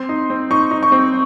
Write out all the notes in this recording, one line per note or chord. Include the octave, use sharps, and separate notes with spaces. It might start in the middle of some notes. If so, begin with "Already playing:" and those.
Already playing: C4 C6
D#4
C4
D#4 C#6
D#4
C#6
C4